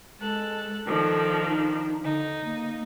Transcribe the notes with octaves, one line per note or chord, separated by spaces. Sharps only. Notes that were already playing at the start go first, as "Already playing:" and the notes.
G#3 A4 F#6
D#3 F3 D4 A4
D#4
D3 D#4
A#3